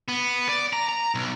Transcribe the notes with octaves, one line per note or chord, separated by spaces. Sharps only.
B3
D5
A#5
A#5
B1